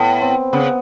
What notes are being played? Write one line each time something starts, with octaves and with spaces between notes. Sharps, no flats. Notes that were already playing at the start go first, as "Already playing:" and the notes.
Already playing: A2 B3
C4
C#3 B3